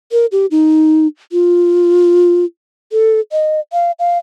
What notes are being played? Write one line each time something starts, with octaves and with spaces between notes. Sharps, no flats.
A#4
G4
D#4
F4
A4
D#5
F5
F5